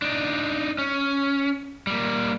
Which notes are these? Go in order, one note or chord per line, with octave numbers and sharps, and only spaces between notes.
D4 D#4
C#4
G3 A#3